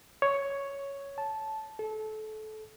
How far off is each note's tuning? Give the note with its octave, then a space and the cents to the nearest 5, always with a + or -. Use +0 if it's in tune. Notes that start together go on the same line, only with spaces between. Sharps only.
C#5 +5
A5 -10
A4 -25